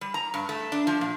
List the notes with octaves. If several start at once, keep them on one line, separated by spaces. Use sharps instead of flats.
G3
A#5
G2
A3
D4
F3
A#2